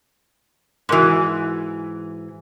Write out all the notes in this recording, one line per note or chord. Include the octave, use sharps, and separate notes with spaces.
G#2 E3 F#4 A#4 C6